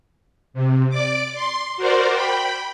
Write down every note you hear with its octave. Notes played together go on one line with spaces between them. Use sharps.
C3
D5 D6
C6
F#4 A#4 C5 D5
G5 B5